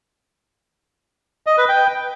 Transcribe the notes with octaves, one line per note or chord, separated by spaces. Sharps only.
D#5
B4
G5